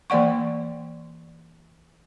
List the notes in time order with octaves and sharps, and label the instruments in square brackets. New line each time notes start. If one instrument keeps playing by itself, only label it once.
[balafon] E3 A#3 D5 F#5 C#6